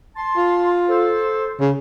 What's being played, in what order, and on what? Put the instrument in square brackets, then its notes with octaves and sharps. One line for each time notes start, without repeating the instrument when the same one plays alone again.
[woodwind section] A5 C6
[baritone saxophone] F4
[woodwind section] A4 C5
[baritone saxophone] C#3